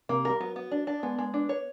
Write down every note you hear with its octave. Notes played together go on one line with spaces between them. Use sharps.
C3 A#3
G3 A#4
F#3 B3
B3
D4
D4
G#3 B3
G#3
D4
C#5